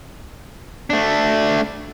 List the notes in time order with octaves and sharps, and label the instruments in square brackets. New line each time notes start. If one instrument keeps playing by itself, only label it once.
[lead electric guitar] A3 D4